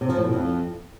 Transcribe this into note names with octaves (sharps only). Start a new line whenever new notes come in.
C3
F3
A2
B2
F2